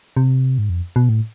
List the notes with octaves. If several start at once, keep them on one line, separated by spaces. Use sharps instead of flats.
C3
G#2
F2
B2
A2